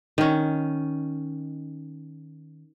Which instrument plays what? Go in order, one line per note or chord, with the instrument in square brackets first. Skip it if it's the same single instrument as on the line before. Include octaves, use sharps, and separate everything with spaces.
[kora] D#3 C#4